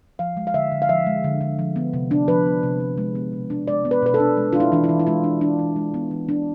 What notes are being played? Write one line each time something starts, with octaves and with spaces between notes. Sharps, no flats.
F3 F5
G#3
F5
D3 E5
D3
F5
F3 E5
G#3
D3
D3
F3
B3
C3
D4
F3 B4
B3
C3
D4
G#3
B3
B2
D4
G#3 D5
B3
B4
B2 B4
A4
D4
G#3
D4 F4
E4
E3 D4
E4
E3
E4
G#3 F4
D4
E3 D4
E3
G#3
B3
E3
D4